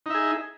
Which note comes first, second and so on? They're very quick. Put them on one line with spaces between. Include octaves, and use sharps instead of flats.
D#4 E5 G#4